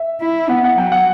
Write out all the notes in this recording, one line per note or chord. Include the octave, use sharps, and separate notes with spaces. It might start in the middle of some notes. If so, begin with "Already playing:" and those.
Already playing: E5
E4
B3 F#5
F#5
F#3 G5
F#5